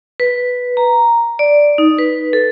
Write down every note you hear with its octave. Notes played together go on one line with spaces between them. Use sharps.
B4
A#5
D5
D#4
B4
A4